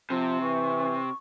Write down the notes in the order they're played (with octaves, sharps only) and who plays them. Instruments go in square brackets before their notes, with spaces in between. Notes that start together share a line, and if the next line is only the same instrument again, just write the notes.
[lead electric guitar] C3 [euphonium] F3
[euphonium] E3 [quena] C#6